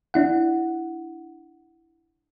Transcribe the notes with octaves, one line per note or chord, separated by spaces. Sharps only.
D4 E4 F#5